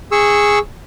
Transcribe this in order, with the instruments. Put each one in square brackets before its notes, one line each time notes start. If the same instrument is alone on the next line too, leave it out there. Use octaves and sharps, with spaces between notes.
[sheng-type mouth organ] G#4 C#6 E6